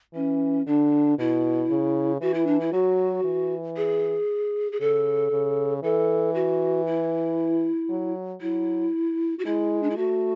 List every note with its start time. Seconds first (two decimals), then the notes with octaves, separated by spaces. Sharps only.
0.14 E3 C#4
0.66 D3 D4
1.18 B2 E4
1.70 C#3
2.21 E3 F#4
2.34 E4
2.46 D4
2.60 E4
2.72 F#3 F#4
3.24 E3
3.76 G#4
4.72 G#4
4.80 C#3 A4
5.31 C#3
5.83 E3 A4
6.34 F#4
6.86 E4
7.89 F#3
8.41 F#3 E4
9.38 F#4
9.45 G#3 E4
9.82 D4
9.89 E4
9.96 A3 F#4